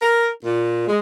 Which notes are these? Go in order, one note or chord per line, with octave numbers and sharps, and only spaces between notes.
A#4
A#2
G#3